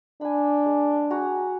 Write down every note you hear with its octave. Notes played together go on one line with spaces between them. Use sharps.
D4 G#5 B5
G#3
F#4 G#4 A#5